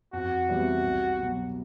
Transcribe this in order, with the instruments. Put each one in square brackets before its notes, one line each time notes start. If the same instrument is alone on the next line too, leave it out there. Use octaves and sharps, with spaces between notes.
[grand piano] F2 [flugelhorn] F#4
[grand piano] C3 E3 G3 B3
C2
B2 F#3